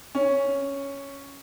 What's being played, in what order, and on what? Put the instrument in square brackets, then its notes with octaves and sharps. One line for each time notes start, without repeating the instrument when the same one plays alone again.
[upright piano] C#4